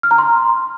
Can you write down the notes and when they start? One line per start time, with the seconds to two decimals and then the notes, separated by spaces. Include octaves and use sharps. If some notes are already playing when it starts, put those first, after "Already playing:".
0.03 F6
0.11 A#5
0.18 C6